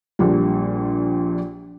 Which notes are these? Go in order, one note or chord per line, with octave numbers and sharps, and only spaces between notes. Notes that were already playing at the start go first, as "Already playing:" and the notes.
A#1 A#2 G3